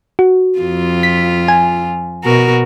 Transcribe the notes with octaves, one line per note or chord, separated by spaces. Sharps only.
F#4
F2 F4
B6
G#5
B2 F#4 A#4